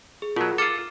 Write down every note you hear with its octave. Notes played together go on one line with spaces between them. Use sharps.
G#4
B2 F#3 F4 A#4
F4 A4 D6 F6